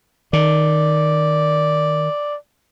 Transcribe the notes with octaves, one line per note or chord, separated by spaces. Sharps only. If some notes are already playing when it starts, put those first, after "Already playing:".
D#3 D5